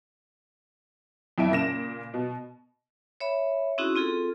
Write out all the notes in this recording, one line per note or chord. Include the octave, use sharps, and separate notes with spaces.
F2 E4 E5 D7
A#2 C#3 A#6 E7
B2
C#5 E5 B5
C4 C#4 D#4 E4 F#4 G#4
C4 F4 G#4 A4